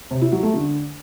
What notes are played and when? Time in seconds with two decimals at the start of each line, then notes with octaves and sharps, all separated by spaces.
0.11 C3
0.22 E4
0.32 F#3
0.43 A3
0.54 D3